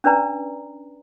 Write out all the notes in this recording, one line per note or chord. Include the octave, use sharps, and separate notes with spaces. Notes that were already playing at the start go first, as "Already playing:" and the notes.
C#4 D4 B4 D5 A#5